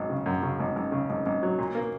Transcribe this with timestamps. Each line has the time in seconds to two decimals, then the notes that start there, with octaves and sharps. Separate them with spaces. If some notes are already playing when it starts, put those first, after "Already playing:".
Already playing: G#1 F#3
0.10 C#3
0.26 F#2
0.43 C#3
0.60 G#1
0.76 G#1
0.92 C#3
1.10 G#1
1.26 G#1
1.43 F#3
1.58 A#2
1.75 A#3